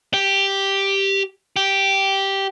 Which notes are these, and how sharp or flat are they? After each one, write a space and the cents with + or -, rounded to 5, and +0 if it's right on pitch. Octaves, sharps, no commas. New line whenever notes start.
G4 +0
G4 -5